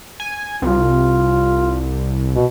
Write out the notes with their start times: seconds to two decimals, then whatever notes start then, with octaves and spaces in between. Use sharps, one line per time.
0.20 G#5
0.62 C2 F4
2.36 B2